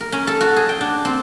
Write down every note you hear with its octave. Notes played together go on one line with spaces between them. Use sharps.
A#4
C#4
A4
F#4
G#4
G5
D4
C4